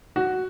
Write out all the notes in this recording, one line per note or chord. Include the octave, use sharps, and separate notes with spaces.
F#4